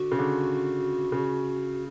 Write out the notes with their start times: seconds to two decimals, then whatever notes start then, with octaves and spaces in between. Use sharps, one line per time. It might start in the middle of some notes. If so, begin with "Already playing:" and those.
Already playing: D3 F#4
0.12 C#3
0.19 D3
1.12 C#3